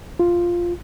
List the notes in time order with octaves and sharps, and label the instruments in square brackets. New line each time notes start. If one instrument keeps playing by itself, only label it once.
[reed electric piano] F4